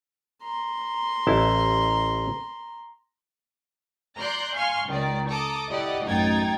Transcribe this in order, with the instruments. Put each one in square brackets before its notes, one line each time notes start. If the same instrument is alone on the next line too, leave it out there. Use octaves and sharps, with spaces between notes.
[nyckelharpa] A#5 C6
[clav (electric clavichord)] A1 E4 A5
[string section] D5 A#5 C6 F#6 G6
F5 G#5 C6 C#6 F6
C#2 D#3 D5
A4 A#5 D6 D#6
E4 G4 D5 D#5 F#5
A1 F#2 D#4 G5 G#6 A6